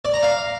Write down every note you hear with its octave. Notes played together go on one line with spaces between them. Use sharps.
D5
A#5
F5